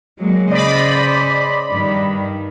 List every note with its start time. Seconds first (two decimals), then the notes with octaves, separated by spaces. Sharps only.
0.18 F#3 G#3 A#3
0.51 C#3 C5 D5 D#5 B5
1.70 G2 D#3